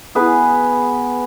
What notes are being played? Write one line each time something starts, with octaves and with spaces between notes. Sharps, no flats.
B3 G#4 B4